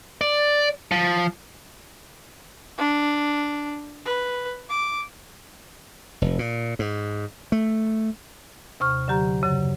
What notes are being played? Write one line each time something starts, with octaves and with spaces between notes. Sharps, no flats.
D5
F3
D4
B4
D6
F1
A#2
G#2
A3
D#2 C3 C#6 F6
D3 F#3 G4 A#5
F#2 C#3 F#3